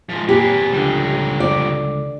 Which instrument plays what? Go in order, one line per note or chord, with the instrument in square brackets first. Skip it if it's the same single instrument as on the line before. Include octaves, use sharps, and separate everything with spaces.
[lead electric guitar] F3 G#3
[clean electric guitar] A#2 [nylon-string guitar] G4 [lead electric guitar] G#4 B4
[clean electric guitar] C#2 D3 [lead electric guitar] F3 G3
[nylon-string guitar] D5